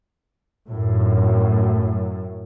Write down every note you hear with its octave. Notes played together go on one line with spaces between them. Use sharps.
F#2 A2